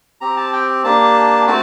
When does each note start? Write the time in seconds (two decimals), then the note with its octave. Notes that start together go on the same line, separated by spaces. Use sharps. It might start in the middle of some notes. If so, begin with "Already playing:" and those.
0.21 C4 G4 A#5
0.37 A5
0.53 G5
0.84 A#3 D4 G4 A5
1.47 A3 C4 F#4 A5